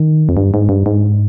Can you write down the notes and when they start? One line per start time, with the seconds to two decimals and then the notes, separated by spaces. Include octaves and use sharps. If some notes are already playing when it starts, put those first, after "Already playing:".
Already playing: D#3
0.29 F2
0.37 G2
0.54 G#2
0.69 G2
0.86 G#2